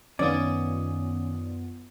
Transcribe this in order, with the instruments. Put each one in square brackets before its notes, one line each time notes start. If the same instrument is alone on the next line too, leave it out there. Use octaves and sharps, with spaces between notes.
[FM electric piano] F#2 B3 F4 [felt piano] D#3 [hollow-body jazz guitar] C#4 [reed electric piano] D5 D#6